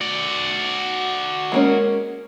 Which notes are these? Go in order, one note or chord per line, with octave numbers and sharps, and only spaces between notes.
F#4 D5
G#3 A#3 C#4